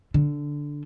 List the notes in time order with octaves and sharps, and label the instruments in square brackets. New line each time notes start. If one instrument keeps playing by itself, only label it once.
[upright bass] D3